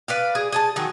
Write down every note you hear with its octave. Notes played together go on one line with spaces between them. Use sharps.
B4 D5 F5
G#4
G#4 G#5 A5
D#3 F#3 G#4